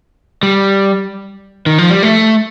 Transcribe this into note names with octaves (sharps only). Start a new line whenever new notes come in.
G3
D#3
F3
G3
A3